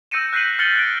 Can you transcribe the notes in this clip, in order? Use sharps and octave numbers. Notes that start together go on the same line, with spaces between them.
E6 G6 A#6 C#7 D#7 E7
F#6 G6 B6 C7 D#7 F#7
F6 A6 C#7 F#7 G7
F#6 D7